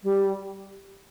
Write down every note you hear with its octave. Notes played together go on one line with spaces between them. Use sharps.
G3